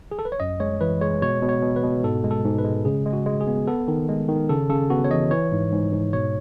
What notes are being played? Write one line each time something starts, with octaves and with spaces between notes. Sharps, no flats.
G#4
A4
B4
C#5
F#2 D#5
G#3 C#5
E3 B4
G#3 C#5
B2 C#5
B2
C#5
B2
B4
B2
G#2 A4
G#3
A4
G#2
B4
G#3
C#3 G#4
G#3
F#4
G#3
G#4
B3
B3 A4
D#3
G#3
D#3
C#3 A4
C#3 A4
B3 F#4
C#5
E3 D#5
E3 C#5
G#2
G#2
G#2
B2 C#5